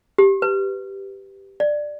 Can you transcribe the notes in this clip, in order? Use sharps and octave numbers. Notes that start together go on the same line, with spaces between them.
G4
B4
D5